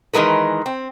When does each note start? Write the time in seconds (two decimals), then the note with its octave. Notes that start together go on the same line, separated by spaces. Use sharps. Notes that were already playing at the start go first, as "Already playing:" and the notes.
0.13 D#3 E3 G#3 A#4 B4
0.66 C4